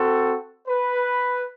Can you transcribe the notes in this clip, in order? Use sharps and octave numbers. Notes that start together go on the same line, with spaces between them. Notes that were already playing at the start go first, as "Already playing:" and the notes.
Already playing: C4 F#4 A4
B4